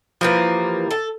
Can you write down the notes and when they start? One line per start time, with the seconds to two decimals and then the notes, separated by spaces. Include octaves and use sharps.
0.21 E3 F3 G3 A#3 B4
0.91 A4